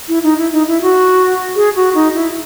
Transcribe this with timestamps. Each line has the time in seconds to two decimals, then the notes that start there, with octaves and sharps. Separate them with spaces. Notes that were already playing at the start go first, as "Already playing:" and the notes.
0.09 E4
0.23 D#4
0.38 E4
0.52 D#4
0.68 E4
0.82 F#4
1.56 G#4
1.76 F#4
1.95 D#4
2.14 E4